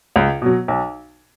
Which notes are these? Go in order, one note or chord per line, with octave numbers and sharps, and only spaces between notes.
C#2
B2 F#3
B1